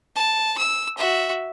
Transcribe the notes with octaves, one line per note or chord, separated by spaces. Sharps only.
A5
E6
F#4 E5